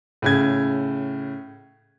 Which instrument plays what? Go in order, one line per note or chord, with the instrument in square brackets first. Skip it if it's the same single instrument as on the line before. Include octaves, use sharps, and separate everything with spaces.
[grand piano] A2 C#3 G#6